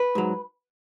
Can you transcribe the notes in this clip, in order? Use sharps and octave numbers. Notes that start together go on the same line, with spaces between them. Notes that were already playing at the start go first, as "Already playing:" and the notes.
Already playing: B4
G#2 F#3